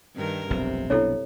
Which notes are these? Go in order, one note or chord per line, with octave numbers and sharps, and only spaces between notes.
G2 D#3 A#4
F1 B1 C3
B1 B3 D4 E4 A4 C#5